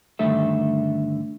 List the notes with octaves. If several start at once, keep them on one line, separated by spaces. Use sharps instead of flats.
G2 D3 D#3 A3 A4 E5